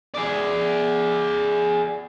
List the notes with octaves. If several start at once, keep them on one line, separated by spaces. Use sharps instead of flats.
G#4 D5